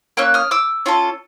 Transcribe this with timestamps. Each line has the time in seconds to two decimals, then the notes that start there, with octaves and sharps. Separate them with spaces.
0.17 A#3 C#4 E6 F#6
0.34 D#6 F6
0.51 D6 E6
0.86 C#4 F4 A4